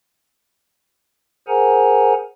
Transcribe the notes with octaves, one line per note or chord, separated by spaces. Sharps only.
G#4 A#4 C5 F#5 G#5 A#5